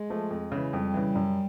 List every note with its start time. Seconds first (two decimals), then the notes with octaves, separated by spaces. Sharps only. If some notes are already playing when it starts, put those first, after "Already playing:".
Already playing: G#3
0.10 F3 A3
0.30 F2
0.52 C#3 E3
0.73 F2 G3
0.94 C#3 E3
1.15 F#2